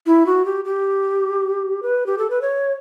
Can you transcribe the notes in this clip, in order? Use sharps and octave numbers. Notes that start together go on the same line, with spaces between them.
E4
F#4
G4
G4
B4
G4
A4
B4
C#5